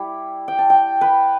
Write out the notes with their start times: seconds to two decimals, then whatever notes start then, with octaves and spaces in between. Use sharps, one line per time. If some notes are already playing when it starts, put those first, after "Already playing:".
Already playing: G3 E4
0.48 G5
0.58 A5
0.70 G5
1.01 B4